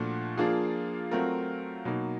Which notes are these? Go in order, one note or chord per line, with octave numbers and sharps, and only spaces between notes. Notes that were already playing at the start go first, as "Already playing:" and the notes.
Already playing: A#2 F3 A3 D4 F#4
F3 A#3 D4 F4 G#4
F#3 A3 C4 F4 A#4
B2 F#3 A#3 D#4